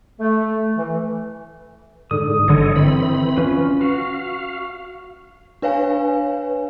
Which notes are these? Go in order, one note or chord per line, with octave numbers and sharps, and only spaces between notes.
A3
E3
G#2 D3 D#6
G1 D3 A4 C#5 D#5
E3 C4 B5
C#4 F4 B4
F#4 F5
D4 B4 C#5 F5 G#5